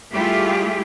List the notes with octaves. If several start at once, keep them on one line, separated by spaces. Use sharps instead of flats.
G3 A3 E4 F4 G4 G#4